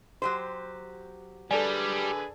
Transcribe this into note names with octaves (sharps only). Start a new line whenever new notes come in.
F#3 G4 C5
D3 G3 G#4 A4 B4 D5 G#5